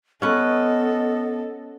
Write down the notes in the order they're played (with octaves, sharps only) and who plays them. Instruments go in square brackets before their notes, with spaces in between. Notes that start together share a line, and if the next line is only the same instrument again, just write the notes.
[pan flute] B3 [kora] C#4 B4 [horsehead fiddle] A4 [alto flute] D#5